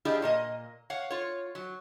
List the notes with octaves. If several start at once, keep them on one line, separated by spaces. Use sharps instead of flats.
D4 E4 F4 G4 G#4 D#5
A#2 A#3 D#5
C#5 F5 F#5
F4 C#5
F#3